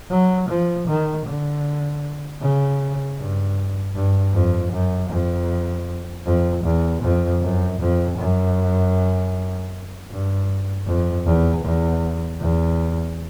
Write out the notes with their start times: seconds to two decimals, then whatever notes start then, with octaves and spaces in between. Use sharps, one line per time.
0.11 F#3
0.49 F3
0.87 D#3
1.26 D3
2.42 C#3
3.19 G2
3.95 G2
4.34 F2
4.73 F#2
5.10 F2
6.26 F2
6.64 E2
7.02 F2
7.42 F#2
7.80 F2
8.18 F#2
10.11 G2
10.87 F2
11.26 E2
11.64 E2
12.41 E2